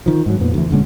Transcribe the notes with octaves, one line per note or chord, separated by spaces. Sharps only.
D#3 F3
G#2 F#3
F2 A#2 B3
D2 E3
D#1 D3 G#3 C#4